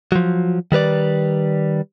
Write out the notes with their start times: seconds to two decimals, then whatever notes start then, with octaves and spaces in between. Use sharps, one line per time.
0.12 F3 F#3
0.72 D#3 G3 B4 D5